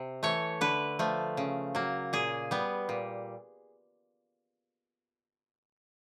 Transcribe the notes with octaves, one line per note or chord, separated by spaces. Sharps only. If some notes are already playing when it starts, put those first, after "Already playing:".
Already playing: C3
E3 A3 C#5
D3 B4
F3 A3
C#3
F#3 A#3
A#2 G#4
G3 B3
A#2